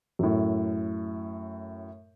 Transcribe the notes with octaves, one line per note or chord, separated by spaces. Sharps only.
F#2 A2